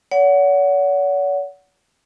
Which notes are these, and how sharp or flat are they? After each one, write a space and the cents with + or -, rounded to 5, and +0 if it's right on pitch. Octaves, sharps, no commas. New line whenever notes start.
C#5 +45 F#5 +0